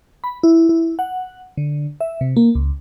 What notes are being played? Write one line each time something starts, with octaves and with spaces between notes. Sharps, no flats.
B5
E4
E4
F#5
D3
E5
C3
A#3
C#2